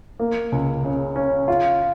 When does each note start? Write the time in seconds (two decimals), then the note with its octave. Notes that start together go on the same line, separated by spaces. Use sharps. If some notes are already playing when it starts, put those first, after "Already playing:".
0.20 A#3
0.52 C#2
0.84 C#3
1.16 C#4
1.48 F4